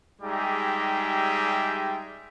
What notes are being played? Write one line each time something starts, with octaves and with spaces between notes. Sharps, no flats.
G3 G#3 D#4 G4 G#4 E5